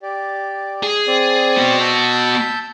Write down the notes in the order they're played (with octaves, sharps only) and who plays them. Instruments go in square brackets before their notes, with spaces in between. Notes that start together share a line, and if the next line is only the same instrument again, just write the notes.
[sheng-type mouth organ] G4 D5
[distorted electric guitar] G#4
[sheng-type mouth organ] C4 D5
[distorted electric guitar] B3 F#4
[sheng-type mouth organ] A5 E6 G6